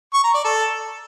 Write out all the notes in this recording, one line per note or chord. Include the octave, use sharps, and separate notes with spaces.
C#6
A#5
D5
A4